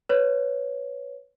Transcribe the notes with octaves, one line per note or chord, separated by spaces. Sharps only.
B4 C#5